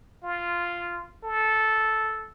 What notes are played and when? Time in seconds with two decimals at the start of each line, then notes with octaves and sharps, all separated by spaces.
0.24 F4
1.24 A4